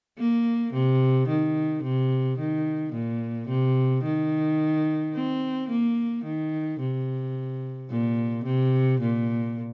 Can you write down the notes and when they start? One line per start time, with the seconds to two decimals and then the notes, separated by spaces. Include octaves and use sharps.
0.18 A#3
0.73 C3
1.28 D#3
1.83 C3
2.38 D#3
2.93 A#2
3.48 C3
4.03 D#3
5.14 C4
5.69 A#3
6.25 D#3
6.80 C3
7.90 A#2
8.45 C3
9.01 A#2